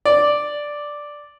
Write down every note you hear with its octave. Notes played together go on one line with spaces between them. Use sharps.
D5